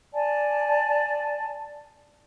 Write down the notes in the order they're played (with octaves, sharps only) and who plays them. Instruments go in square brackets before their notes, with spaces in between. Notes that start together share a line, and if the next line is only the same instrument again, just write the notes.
[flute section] D5 G#5 A5